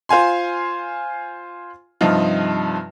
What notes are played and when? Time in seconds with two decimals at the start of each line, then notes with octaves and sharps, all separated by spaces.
0.09 F4 C5 F5 G#5 C6
2.01 G2 C3 F3 D#4 F4